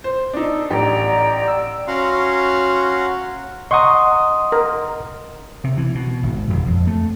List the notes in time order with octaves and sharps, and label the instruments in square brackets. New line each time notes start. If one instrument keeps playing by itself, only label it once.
[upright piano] C5
[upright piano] D4 D#4 [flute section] A4
[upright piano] A1 G4 [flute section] D5 G5 A#5
[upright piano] E6
[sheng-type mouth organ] C#4 F#4 F5 F#5 A#5 C6
[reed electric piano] D#5 F#5 A#5 [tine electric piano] C6 D#6 [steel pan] C#6
[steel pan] A#4
[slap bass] C3
E3
B2
G#1
E1
F2
A3